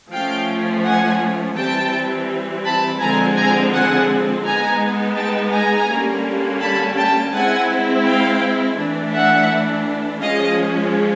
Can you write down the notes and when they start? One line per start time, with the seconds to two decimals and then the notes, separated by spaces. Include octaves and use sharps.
0.12 F3 A3 C#4 F5 G5
0.84 F#5 G#5
1.56 E3 G3 C4 G5 A5
2.65 A5 B5
3.00 D3 F3 G#3 C4 G#5 A#5
3.36 G#5 A#5
3.73 F#5 G#5
4.45 G#3 B3 D#4 G#5 A#5
5.17 G5 A5
5.53 G#5 A#5
5.88 D3 G3 A#3 C#4
6.60 A5 B5
6.97 G5 A5
7.33 G#3 C4 E4 F#5 G#5
8.05 F5 G5
8.78 E3 A3 D4
9.13 E5 F#5
10.21 F3 G#3 C#4 D#5 F5